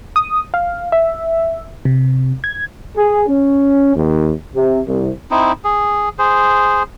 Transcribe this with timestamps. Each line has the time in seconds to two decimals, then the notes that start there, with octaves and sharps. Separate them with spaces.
0.16 D#6
0.54 F5
0.92 E5
1.85 C3
2.44 G#6
2.96 G#4
3.27 C#4
3.95 D#2
4.54 C3
4.87 C2
5.31 C4 D#4 E4
5.64 G#4
6.19 G#4 C5